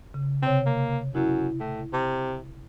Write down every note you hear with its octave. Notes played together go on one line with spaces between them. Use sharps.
C#3
C3 C4 C#5
A#3
F#2 E4
A2
C3